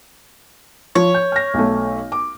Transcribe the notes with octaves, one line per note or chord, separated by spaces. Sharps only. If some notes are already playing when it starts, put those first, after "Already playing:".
F3 C#5
G6
F6 A#6
B1 A3
D6